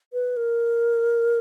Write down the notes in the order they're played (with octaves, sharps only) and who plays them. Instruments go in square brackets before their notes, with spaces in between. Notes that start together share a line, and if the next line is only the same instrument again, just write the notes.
[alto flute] B4
A#4